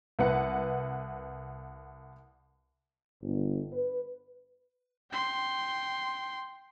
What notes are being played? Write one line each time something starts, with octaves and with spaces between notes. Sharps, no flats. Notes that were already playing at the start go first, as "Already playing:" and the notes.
C2 B4 F#5
G1
B4
G5 C6